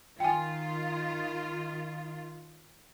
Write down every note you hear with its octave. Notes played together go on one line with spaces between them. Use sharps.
D#3 F4 G5 G#5